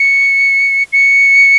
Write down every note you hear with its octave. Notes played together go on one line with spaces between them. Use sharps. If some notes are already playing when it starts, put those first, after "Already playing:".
Already playing: C#7
C#7